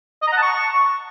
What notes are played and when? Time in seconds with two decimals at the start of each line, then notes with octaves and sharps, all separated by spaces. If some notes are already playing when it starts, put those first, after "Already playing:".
0.22 D#5
0.27 A#5
0.32 F#5
0.37 A5
0.42 C#6